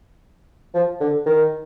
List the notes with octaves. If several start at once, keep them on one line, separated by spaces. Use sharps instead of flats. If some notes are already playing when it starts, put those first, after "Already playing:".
F3
D3
D#3